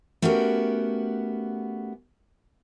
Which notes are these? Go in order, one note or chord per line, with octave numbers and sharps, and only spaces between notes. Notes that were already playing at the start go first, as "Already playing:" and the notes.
A3 B3 C#4 F#4 G4 A#4